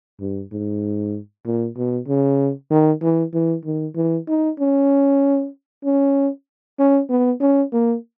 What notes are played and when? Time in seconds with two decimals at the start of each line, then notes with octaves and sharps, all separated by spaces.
0.20 G2
0.52 G#2
1.46 A#2
1.77 B2
2.08 C#3
2.70 D#3
3.02 E3
3.34 E3
3.65 D#3
3.96 E3
4.28 D#4
4.60 C#4
5.84 C#4
6.79 C#4
7.10 B3
7.41 C#4
7.73 A#3